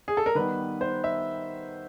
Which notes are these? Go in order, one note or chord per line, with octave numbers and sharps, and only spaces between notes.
G#4
A4
A#4
D#3 G3 B3 B4
C5
E5